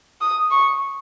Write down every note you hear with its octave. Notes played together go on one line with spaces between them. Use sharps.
D#6
C#6